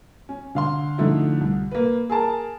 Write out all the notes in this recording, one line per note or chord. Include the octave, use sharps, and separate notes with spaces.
C#4
D3 F5 C6
D3 F3 A3 D#4 E4
C2
A#3 B4
G#4 A#4 A5